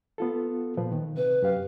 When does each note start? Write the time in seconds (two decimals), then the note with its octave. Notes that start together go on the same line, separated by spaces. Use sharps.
0.18 B3 F4 A4
0.77 A#2 F3 B4
0.92 D#3
1.17 C3 B4
1.42 F#2 G4 F5